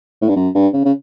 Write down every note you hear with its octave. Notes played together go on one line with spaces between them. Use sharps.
A2
G2
F#2
G2
C#3
C#3